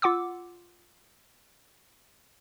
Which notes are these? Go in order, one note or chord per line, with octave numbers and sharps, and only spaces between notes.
F4 F#5 D6 E6